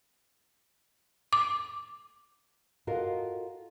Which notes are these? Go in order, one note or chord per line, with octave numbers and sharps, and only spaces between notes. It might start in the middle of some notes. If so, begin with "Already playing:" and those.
D6
F4 F#4 A4 A#4 D#5 F5